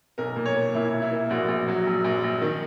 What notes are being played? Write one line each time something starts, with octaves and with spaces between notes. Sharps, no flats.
B1 A#4
A#2
C#5
A#3
A#2 E4
A#2
E4
A#3
A#1 F#4
A#1
F#3
A#1
A#1
A#1
D#3